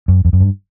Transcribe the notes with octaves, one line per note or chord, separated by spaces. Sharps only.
F#2
F2
F#2
G2